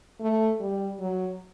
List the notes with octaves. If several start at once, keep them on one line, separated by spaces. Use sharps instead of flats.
A3
G3
F#3